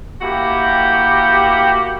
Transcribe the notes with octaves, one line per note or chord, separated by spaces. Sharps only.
A#3 E4 F#4 G4